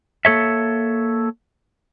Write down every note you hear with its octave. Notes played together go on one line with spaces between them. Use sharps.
A#3 A4 C#5 E5